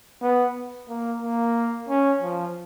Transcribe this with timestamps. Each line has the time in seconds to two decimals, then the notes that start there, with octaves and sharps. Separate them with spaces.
0.22 B3
0.89 A#3
1.22 A#3
1.89 C#4
2.22 F3